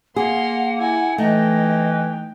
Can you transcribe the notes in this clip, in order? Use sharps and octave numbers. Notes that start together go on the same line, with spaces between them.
A#3 G#4 F5 F#5 C6
E4 G#5
E3 A3 D#4 D#5 G5